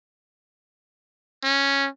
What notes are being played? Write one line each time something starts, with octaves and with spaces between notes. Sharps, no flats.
C#4